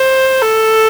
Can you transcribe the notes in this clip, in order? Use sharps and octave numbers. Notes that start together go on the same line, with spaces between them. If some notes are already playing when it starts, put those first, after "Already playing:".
Already playing: C5
A4